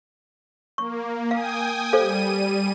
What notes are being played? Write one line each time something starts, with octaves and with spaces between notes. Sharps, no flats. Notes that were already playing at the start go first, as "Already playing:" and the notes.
A#3 C#6
F5 G5 G#5 D#6
G3 A4 C5 F5 D#7